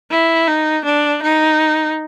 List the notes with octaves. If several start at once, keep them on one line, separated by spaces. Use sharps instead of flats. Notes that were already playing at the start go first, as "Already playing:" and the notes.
E4
D#4
D4
D#4